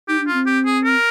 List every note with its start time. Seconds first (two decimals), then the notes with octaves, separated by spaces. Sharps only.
0.08 D#4 G4
0.21 D4
0.27 F4
0.33 C4
0.46 G4
0.66 G#4
0.84 A#4